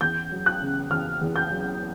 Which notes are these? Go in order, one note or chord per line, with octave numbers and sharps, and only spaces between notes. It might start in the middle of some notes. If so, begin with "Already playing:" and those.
E2 G6
F#3
F#6
C#3
E2 F6
E2
G6
F#3